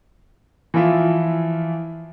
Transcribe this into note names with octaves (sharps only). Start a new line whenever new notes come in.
E3 F3 E4 F4 E5